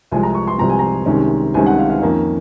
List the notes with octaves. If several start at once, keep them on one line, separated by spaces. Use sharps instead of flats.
C2 C3 F3 G#3 G#5
A#5
C#6
C6
C2 C3 F3 G#3 A#5
G#5
A#5
C2 C3 D#3 G#3 C#4
C2 C3 D#3 G#3 C#4 G#5
F#5
F5
F5
F2 D#3 A#3 C#4